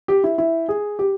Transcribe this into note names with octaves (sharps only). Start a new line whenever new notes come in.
G4
E4
E4
G#4
G4